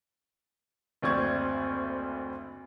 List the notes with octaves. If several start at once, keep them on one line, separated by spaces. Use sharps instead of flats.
F#1 D2 C4 D5 C#6 G#6